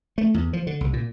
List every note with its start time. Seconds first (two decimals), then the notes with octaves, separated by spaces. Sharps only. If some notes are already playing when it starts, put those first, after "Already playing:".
0.18 A3
0.34 E2
0.53 F3
0.67 D3
0.81 C2
0.93 A#2